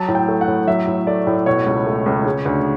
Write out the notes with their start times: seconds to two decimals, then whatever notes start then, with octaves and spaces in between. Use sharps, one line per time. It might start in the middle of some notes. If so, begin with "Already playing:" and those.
Already playing: F#3 A5
0.08 A2
0.15 G5
0.28 A3
0.41 F#5
0.48 A2
0.68 F#3 E5
0.87 A2
1.07 A3 D5
1.27 A2
1.46 B2 C#5
1.66 C#2
1.86 A3
2.06 C#2
2.26 C#3
2.45 D2